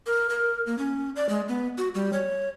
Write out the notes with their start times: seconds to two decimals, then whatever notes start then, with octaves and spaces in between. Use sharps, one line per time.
0.06 A#4
0.30 A#4
0.66 A#3
0.78 C#4
1.16 D5
1.29 G#3
1.48 B3
1.78 F#4
1.95 G3
2.13 C#5